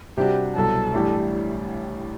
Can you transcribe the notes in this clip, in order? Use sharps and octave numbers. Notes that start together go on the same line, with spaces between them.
C3 G3 D4 F#4 G4
C2 B2 F#3 A4
A1 A2 G3 D4 G4